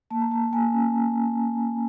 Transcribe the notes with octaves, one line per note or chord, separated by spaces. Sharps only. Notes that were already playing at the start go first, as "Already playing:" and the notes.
A#3 A5
A#5
A#3 A5
A#3 G#5
C#4